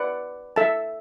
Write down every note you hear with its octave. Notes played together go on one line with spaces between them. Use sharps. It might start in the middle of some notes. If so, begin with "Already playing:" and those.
Already playing: B4 D5 F#5
A4 E5 A5